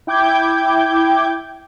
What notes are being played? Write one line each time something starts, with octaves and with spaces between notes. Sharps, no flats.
E4 G5 D6 G6 G#6